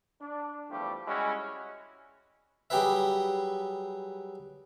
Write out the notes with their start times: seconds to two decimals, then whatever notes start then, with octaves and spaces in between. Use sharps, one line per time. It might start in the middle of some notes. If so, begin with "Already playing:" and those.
0.21 D4
0.70 E2 F3 G3 A3 G4
1.07 G3 G#3 C#4 E4 F#4
2.70 F#3 G3 G4 G#4 B4 E5